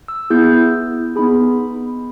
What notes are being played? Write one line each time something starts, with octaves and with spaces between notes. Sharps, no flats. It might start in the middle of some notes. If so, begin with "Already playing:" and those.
E6
B3 E4 G#4 G6
B3 D#4 G#4 B5